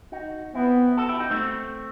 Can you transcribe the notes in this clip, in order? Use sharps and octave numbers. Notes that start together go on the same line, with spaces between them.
D#4 F#4
B3 C4 E4
F#4 A4
E4 G4
D#4 F#4
A3 C4